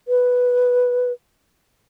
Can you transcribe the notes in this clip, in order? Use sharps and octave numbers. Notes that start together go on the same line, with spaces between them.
B4